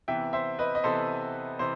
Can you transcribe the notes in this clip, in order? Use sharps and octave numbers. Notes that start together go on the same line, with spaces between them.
C3 E3 B3 E5 G5
C5 E5
B4 D#5
D#5
C3 E3 B3 A4 C5
C3 E3 C5